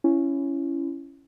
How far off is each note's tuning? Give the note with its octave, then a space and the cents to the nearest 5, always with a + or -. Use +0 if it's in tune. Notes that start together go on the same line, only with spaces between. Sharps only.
C#4 +0 E4 +20